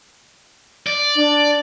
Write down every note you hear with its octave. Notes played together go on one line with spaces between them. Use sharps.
D5
D4